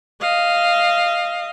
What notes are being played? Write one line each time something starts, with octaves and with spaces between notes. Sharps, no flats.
D#5 F5